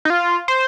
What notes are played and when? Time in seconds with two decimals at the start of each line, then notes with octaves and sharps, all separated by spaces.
0.05 D#4
0.10 F4
0.48 C5